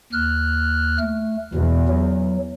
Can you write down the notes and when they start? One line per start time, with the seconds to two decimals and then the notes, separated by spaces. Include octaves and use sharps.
0.13 D#2 F6 F#6
1.00 A3
1.55 E2 B2
1.89 F#3